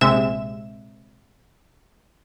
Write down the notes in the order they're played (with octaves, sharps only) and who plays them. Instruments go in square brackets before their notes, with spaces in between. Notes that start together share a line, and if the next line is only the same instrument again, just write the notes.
[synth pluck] A#1 C3 G#3 E5 E7